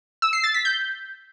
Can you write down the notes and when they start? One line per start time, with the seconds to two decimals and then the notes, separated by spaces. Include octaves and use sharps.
0.22 E6
0.33 C7
0.44 A6
0.54 B6
0.65 G6